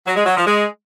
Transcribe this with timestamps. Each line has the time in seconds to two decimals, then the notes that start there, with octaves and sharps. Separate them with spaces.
0.06 F#3
0.16 G#3
0.26 F#3
0.36 F3
0.46 G#3